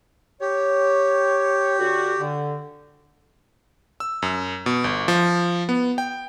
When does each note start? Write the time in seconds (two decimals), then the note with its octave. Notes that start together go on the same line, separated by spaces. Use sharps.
0.41 G4 C#5
1.79 D3 F#4
2.20 D3
4.00 E6
4.22 F#2
4.66 B2
4.84 G1
5.08 F3
5.69 B3
5.98 G5